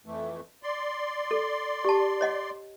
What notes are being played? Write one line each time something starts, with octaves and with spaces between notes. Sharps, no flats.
F2 E3 A3
D5 C6
A4
G4 A5
C#5 D#5 F#5